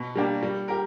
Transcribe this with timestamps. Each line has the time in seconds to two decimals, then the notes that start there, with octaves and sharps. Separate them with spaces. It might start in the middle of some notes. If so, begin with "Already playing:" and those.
Already playing: B2
0.16 G3 A#3 D4 G4
0.43 G3
0.68 G4 A#4